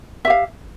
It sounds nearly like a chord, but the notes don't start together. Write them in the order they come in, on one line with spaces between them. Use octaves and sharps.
E5 G4 F5